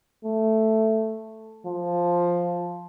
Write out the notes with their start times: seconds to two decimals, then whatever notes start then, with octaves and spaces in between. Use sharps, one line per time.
0.24 A3
1.65 F3